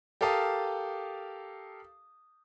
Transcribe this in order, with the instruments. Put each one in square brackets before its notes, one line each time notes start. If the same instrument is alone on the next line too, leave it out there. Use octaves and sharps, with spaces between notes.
[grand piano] G4 A4 A#4 F5 A5 D#6